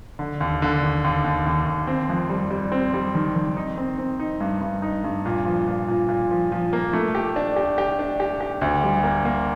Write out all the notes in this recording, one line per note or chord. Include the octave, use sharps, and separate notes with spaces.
D3
D#2
D3
D#2
D#2
D#2
D#2
D#2
C4
F2
G3
G3
C4
G3
D#3
D#3
D#4
C4
C4
D#4
G2
G2
D#4
G2
A#2
F3
A#2
A#2
A#2
F3
F3
A#3
A3
G4
D4
G4
G4
D4
G4
G4
D2
G3
A#3
A#3